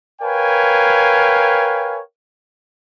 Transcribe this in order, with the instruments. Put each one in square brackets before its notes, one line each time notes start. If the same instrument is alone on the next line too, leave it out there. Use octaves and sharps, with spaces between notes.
[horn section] A#4 B4 C#5 F5 G5 G#5